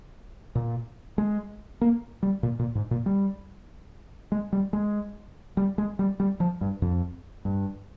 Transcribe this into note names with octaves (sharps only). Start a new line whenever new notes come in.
A#2
G#3
A#3
G3
A#2
A#2
G#2
A#2
G3
G#3
G3
G#3
G3
G#3
G3
G3
F3
G2
F2
G2